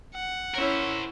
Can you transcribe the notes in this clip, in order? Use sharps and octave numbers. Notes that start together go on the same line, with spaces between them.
F#5
C#4 E4 A#4 C5